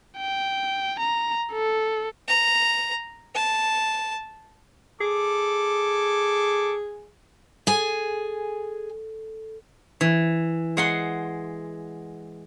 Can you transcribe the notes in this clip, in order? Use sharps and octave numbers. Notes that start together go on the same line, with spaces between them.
G5
A#5
A4
A#5
A5
G#4 A4 D6
G#4 A4 G#5
E3
G#3 F#5 C6